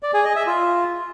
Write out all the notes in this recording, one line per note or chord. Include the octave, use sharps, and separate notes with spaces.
D5
G#4
D#5
E5
F4